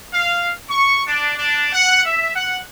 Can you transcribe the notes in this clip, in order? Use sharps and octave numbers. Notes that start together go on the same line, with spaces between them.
F5
C#6
D4
D4
F#5
E5
F#5